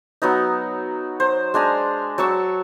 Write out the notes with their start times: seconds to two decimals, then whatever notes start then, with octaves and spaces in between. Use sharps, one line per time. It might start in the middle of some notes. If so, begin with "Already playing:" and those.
0.22 F#3 B3 D#4
1.20 C5
1.54 G#3 D4 G#5 A#5
2.18 F#3 A5 C#6 E6